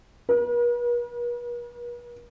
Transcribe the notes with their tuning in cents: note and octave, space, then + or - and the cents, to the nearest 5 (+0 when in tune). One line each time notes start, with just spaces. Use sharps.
B4 -45